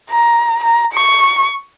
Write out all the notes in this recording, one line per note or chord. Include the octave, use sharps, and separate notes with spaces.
A#5
A#5
C#6